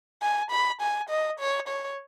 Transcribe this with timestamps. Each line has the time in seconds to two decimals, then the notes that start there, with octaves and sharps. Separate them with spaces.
0.22 G#5
0.51 B5
0.81 G#5
1.10 D#5
1.40 C#5
1.68 C#5